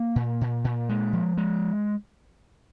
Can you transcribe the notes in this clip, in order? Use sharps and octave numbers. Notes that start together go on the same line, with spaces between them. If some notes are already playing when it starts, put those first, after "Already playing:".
Already playing: A#3
A#2
A#2
A#2
G#3
F3
G#3